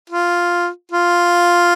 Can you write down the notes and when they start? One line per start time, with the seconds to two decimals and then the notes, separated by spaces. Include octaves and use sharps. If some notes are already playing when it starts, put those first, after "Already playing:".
0.10 F4
0.92 F4